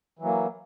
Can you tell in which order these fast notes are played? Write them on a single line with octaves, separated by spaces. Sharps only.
E3 F#3 A#3